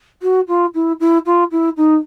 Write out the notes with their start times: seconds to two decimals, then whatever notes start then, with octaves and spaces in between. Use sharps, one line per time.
0.22 F#4
0.48 F4
0.74 E4
1.00 E4
1.26 F4
1.51 E4
1.77 D#4